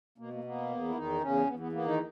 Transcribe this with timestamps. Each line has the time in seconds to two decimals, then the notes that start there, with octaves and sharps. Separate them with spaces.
0.18 B2 A#3
0.33 A#3
0.44 A#3 B3
0.70 E2
0.88 E4
0.95 E2 D#3 D#4
1.21 E2 C#3 C#4
1.47 E2 B3
1.59 B3
1.72 A#3 B3
1.85 D#3 D#4